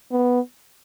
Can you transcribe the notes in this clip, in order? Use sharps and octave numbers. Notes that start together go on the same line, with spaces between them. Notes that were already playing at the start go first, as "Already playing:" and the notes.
B3